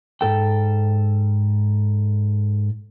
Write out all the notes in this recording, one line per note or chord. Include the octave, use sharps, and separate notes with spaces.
G#2 A4 G5